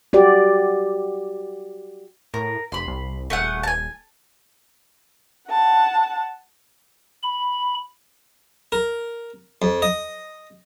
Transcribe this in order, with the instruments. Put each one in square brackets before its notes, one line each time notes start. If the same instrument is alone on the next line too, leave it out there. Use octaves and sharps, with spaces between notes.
[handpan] F#4 G4 D5
[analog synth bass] A2 [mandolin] A#4
[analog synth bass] F1 [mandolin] B5 C6
[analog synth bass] C2
[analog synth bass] D#1 [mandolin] A3 G#4 F#5
[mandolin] G#5 A5
[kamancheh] F#5 A5
[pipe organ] B5
[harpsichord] A#4
F2
D#5